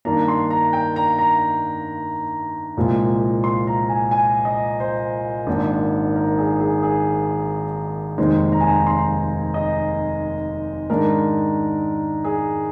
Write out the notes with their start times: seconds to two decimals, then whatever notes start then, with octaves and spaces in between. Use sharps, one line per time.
0.05 G2 D#3 A#3 D4 A#5
0.28 C6
0.50 A#5
0.73 G5
0.96 A#5
1.18 A#5
2.77 C2 A#2 F3 G#3
3.44 C6
3.67 A#5
3.89 G#5
4.11 G#5
4.45 D#5
4.80 C5
5.47 G#1 G#2 D#3 A#3 D4
6.16 A#4
6.38 G#4
6.60 G#4
6.83 G#4
8.18 F1 D#2 D#3 G#3 C5
8.52 A#5
8.61 G#5
8.69 A#5
8.87 C6
9.54 D#5
10.90 G#2 D#3 G#3 D4 A#4
12.24 G#4